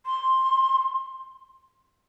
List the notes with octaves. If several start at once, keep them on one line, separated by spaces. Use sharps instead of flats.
C6